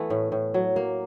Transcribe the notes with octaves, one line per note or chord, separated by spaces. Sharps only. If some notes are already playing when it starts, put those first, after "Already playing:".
Already playing: E3 A3 B3
A2
A2
F#3
A#3